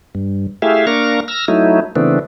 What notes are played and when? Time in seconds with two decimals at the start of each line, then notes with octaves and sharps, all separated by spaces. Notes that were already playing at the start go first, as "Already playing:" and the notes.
0.15 G2
0.62 A3 E4 G4 G#4 E5 F5
0.87 A#3 D4 A#4 F5 A#5 C#6
1.28 E6 F6 A#6
1.48 F#3 A3 D#4 E4
1.96 C#3 E3 A3 B3 C4 D4